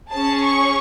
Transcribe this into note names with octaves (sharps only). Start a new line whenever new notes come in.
C#4 G#4 A5
C#6